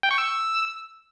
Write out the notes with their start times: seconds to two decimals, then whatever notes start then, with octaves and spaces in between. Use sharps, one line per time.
0.03 G5
0.11 C#6
0.18 E6